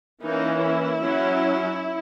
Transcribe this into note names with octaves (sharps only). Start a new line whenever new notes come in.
E3 A#3 C#4 D#4
E4
F#3 C#4